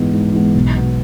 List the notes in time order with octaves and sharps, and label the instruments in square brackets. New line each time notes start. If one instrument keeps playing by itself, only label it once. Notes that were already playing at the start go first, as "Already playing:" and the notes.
Already playing: [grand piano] G#2 E3 G#3 B3
G#2
E3 G#3 B3
B1
B2 B3